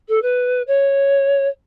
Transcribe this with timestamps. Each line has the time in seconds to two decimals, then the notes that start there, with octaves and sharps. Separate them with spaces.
0.08 A4
0.22 B4
0.67 C#5